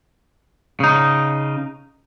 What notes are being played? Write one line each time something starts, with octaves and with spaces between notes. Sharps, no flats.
C#3 D#4